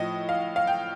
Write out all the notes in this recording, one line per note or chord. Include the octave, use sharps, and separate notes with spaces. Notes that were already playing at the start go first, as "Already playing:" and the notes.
Already playing: A2 F3 D#5
F5
F5
G5